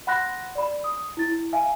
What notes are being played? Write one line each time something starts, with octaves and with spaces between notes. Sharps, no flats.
F#5 B5 C6 F#6 A#6
D5 B5
D#6
E4 A6
E4
E5 F5 G#5